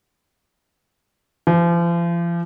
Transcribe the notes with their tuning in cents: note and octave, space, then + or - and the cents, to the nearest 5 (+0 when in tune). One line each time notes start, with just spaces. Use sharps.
F3 -40